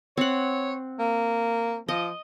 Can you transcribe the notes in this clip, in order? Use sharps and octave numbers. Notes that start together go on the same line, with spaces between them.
C4 C#5 F#5
A#3
F3 D#5